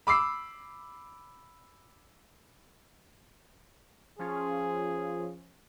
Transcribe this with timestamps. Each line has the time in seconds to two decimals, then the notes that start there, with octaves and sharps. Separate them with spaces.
0.07 B5 D6 E6 C7
4.19 F3 C#4 F4 G#4